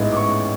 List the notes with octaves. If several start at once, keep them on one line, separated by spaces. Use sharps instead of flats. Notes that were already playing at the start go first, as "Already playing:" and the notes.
Already playing: A1 G#2 G#3 B3 E4
D6
C#6